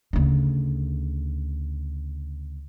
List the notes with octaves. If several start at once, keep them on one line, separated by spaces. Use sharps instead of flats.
D2 C#3